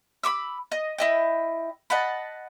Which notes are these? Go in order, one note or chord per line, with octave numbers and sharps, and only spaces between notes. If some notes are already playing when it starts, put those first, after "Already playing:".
B5 C#6 D6 E6
D#5
E4 D#5 G5
D#5 F#5 A5 B5